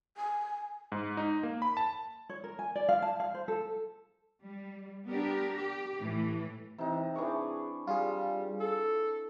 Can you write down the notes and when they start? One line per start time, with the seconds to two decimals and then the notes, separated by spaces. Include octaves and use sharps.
0.17 G#5
0.92 G#2
1.17 D#4
1.43 A#3
1.62 B5
1.77 A5
2.29 C#5
2.44 A#4
2.59 G#5
2.75 D5
2.89 F5
3.02 A5
3.20 F5
3.34 C5
3.48 A4
4.45 G3
5.08 B3 D4 G4 A#4
5.56 G4
6.00 A2 E3
6.78 C3 E3 D#4
7.15 E3 D4 G#4 C#6
7.87 G3 F4 G#4
8.60 A4